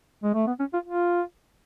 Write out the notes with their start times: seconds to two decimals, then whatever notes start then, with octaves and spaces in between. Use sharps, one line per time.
0.24 G#3
0.34 A3
0.47 B3
0.59 C#4
0.73 F4
0.86 F4